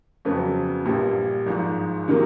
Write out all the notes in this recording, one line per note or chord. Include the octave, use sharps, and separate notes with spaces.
F2 C#3 F#3 B3
A#1 A#2 G3
G#1 G#2 F3 G#3
C3 D#3 F#3 A#3